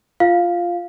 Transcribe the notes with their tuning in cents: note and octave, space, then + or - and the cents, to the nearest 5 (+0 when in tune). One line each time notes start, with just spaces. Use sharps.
F4 -5 F5 +0